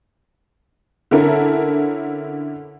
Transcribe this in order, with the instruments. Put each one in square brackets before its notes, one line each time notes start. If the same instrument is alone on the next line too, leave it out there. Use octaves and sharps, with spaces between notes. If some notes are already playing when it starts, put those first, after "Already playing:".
[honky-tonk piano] D3 C#4 E4 A4 A#4